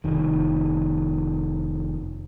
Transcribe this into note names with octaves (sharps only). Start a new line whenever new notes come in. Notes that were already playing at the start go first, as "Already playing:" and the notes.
F1 D#3